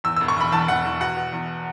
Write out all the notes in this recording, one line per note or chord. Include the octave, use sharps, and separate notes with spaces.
E2 E6
E1 E6
C#6
E1 B5
E2 A5
E2 F#5
E2
B2 F#5
B2
E2